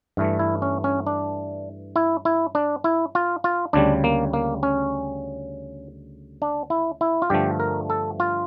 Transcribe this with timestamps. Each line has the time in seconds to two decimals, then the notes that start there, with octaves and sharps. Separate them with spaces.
0.17 G2 E3 A3
0.39 E4
0.62 C#4
0.84 C#4
1.07 D4
1.96 E4
2.25 E4
2.55 D4
2.84 E4
3.15 F4
3.44 F4
3.73 D2 C#3 G3 D4
4.04 A#3
4.33 A#3
4.63 C#4
6.42 D4
6.70 E4
7.01 E4
7.22 F4
7.30 G2 D3 F3 A3 G4
7.60 A#4
7.90 A4
8.20 F4